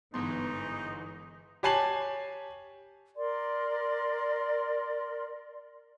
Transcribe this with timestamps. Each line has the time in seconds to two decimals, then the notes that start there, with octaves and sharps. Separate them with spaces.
0.14 G1 G#2 E3 B3 D#4 C6
1.63 G4 C#5 G#5 A5 C7 F#7
3.16 A#4 D5 C6